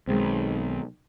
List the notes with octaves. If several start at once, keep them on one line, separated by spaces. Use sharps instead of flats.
B1 D#3 G#3 C4